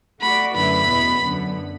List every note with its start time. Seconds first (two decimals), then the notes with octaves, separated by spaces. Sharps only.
0.21 A3 F#4 D5 B5
0.55 F#2 D3 A3 E4 B4 B5
0.89 E2 B2 B3
1.23 F#2 D3 B3